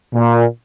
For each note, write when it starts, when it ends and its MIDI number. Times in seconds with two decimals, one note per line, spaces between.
0.14 0.45 46